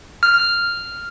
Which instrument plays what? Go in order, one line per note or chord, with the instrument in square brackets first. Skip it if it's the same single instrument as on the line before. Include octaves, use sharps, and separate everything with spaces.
[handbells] F6